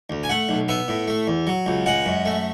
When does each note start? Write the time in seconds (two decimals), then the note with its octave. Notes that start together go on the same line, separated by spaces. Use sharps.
0.10 D2
0.23 G#5
0.29 A3 F#5
0.49 B1
0.68 B3 E5
0.88 A2
1.08 A3
1.27 E2
1.47 F#3
1.66 C#2
1.86 G#3 F#5
2.06 F#2
2.25 A3